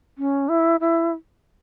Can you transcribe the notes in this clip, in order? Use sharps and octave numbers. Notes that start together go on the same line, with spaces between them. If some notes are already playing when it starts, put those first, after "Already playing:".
C#4
E4
E4